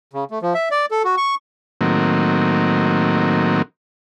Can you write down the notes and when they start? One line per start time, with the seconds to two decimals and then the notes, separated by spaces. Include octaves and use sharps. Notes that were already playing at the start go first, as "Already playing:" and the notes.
0.14 C#3
0.31 A3
0.42 F3
0.54 E5
0.71 D5
0.91 A4
1.04 F#4
1.17 C#6
1.81 A2 D#3 F#3 A#3 C4